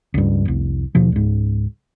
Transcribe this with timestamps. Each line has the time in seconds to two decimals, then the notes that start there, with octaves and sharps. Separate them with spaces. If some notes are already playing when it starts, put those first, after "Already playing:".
0.14 C#2 G2
0.45 F1 C2
0.95 D#2 B2 F3
1.12 C#2 G#2